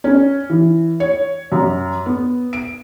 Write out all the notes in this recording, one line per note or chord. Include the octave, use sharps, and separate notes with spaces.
C#4
E3
C#5
F#2
B3
D7